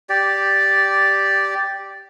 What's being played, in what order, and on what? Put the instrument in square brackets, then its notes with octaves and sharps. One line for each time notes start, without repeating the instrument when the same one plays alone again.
[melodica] G4 D5